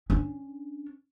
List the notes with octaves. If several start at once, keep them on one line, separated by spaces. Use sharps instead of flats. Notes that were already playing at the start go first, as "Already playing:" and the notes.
C#4 D4